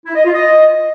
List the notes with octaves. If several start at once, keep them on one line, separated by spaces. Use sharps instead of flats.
E4
D#5
F4
D#5